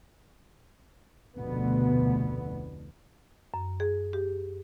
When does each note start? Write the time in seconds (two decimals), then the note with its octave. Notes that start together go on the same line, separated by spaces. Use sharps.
1.36 F1 D2 B2 D3 B3
3.54 F#2
3.80 G#4
4.13 G4